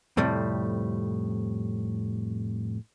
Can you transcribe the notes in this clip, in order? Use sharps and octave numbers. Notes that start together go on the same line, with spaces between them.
F2 A2 C3 G3